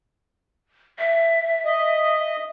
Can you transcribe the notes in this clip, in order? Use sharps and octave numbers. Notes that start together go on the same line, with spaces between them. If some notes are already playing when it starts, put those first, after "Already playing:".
E5
D#5